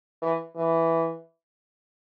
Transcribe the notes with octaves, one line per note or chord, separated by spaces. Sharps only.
E3
E3